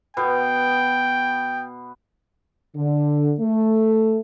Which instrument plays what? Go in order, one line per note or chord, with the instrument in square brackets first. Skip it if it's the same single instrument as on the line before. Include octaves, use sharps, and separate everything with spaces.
[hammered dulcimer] B2 B3 [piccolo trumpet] G5
[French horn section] D3
A3